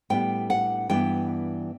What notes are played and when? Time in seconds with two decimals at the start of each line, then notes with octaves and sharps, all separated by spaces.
0.10 A2 G3 B3 D4 G5
0.50 F#5
0.90 G2 E3 B3 D4 G5